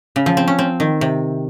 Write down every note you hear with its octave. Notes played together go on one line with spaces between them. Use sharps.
C#3
F3
C4
C#4
C4
D#3
C3